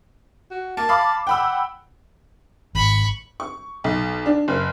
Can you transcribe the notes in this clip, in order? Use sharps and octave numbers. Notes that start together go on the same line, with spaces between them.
F#4
A#3 A5
F5 B5 D6
F#5 G5 B5 E6
G#1 B5 C#6
C#6
B1
D4
F#1